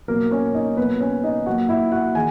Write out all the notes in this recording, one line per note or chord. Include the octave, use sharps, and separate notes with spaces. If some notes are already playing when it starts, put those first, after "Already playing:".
B2 F#3 A#3 A#4
C#4 C#5
D#4 D#5
B2 F#3 A#3 B3 B4
C#4 C#5
D#4 D#5
A#2 F#3 A#3 F#4 F#5
E4 E5
F#4 F#5
D#3 G#4 G#5